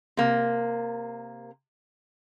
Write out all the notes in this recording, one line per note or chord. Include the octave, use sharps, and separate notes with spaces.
C3 A#3